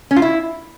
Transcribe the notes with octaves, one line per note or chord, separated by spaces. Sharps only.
C#4
F4
E4